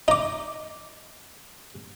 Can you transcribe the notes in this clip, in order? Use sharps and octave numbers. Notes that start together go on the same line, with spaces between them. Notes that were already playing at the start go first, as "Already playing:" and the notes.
D#4 D6